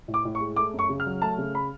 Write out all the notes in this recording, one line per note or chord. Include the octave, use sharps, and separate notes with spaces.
A2
D6
A2
C#6
G#3
A3 D6
F#2
C#6
C#3
F6
F#3
A3 A5
C#3
B5